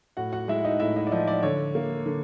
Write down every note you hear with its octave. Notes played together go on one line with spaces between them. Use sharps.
A2 F#4 F#5
F#4 F#5
G#3 E4 E5
D#4 D#5
A2 E4 E5
D#4 D#5
D5
F3 D#4 D#5
D5
D3 C#5
A#3
D3